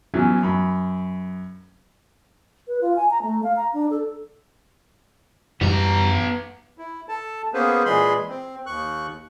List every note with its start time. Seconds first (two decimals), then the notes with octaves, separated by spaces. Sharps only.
0.14 E3 F#3 B3 C#4
0.43 F#2 B5
2.67 B4
2.81 F4
2.96 G#5
3.10 A#5
3.22 A3
3.43 F5
3.56 A#5
3.74 D4
3.90 A4
5.61 F#2 E3 G3 B3 A#5
6.78 E4
7.09 A4 A5
7.54 A#3 B3 C#4 G#4 B4 C5
7.85 A#2 E3 G#3 G#4 B5 C6
8.29 C4
8.66 D#2 C#6 F#6